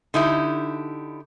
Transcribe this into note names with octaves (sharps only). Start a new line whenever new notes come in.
D3 D#4 E4 G4